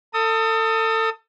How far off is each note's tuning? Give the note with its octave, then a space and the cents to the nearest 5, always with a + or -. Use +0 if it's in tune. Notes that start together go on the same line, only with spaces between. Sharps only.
A4 +30 D#6 +20